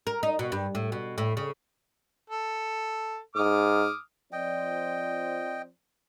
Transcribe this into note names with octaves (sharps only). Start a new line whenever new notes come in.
A#4
D#4
B2
G2
A2
B2
A2
C#3
A4
G#2 D6 D#6 F6
F3 C4 D5 D#5 G5